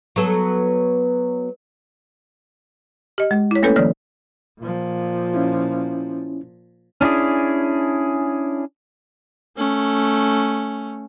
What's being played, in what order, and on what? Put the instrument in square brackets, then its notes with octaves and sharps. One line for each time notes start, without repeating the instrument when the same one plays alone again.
[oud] F#3 B3 A4
[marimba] G4 D#5
G#3
E4 C#5
A3 A#3 C#4 A4 B4 C#5
D3 E3 F#3 A#3 C#5 D5
[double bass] A#2 F3
[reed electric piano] C#4 E4
[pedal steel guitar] C#4 D4 E4 G#4
[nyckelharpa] A3 C#4